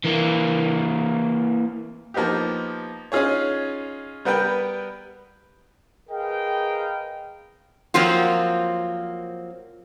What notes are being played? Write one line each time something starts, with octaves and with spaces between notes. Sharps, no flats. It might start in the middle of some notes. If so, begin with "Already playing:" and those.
E3 A#3
F3 A#3 B3 D#4 G4
C#4 D#4 F4 G#4 C#5
G3 B3 A#4 B4 G5
G#4 A#4 B4 D#5 F5 G5
F3 F#3 A#3 C4 F4